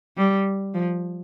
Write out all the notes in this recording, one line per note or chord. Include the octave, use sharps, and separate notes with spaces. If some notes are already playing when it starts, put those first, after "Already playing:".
G3
F3